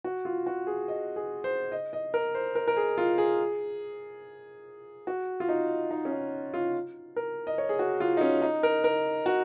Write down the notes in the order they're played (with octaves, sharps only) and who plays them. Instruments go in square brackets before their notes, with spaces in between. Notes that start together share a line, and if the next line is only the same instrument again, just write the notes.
[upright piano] F#4
F4
F#4
G#4
D#5
G#4
C5
D#5
D#5
A#4
C5
A#4
A#4
G#4
F4
G#4
F#4
F4
D#4
D#4
C#4
D#4
F4
A#4
D#5
C#5
G#4
F#4
F4
D#4
C#4
D#4
A#4
A#4
F#4